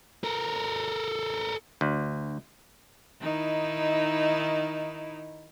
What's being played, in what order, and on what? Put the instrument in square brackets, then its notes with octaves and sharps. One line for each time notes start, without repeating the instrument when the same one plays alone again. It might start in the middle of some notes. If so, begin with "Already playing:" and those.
[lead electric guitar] A4 A#4
[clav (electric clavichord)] D2
[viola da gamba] D#3 D#4 E4